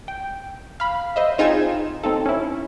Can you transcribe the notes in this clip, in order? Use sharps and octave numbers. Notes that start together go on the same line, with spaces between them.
G5
F5 B5
C5 D#5 E5
C4 D#4 F4 G#4 G#6 E7
C4 D#4 A4
C#4 E4